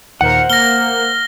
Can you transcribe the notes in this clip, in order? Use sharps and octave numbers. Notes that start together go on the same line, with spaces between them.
D#2 A#2 A#4 C5 F#5 C#7
A#3 F6 A#6 G7